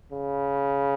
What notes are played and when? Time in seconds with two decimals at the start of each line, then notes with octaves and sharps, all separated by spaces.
0.12 C#3